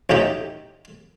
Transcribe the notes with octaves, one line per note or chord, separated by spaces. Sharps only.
A1 A2 D#4 G4